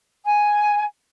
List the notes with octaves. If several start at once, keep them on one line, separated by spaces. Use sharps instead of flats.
G#5